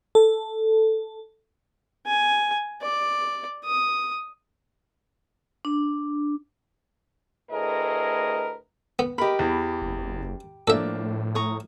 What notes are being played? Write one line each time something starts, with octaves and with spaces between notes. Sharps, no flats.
A4
G#5
D5
D#6
D4
D2 A2 G#4 A#4 B4 D#5
B3
G4 A#4 D#5 B5
E2 E3
F#1
A2 F3 A#3 D4 A4 E5
A#5 C#6 D#6